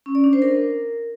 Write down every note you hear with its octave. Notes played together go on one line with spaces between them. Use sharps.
C#4
D5
D4
C5
A#4